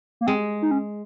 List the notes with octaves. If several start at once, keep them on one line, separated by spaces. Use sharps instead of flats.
A#3
G#3 C4
D#4
C#4